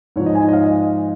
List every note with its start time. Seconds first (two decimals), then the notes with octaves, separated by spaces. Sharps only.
0.16 G#2 F3 C#5
0.26 D#5
0.35 G#5
0.48 D#5
0.53 F5
0.66 D#5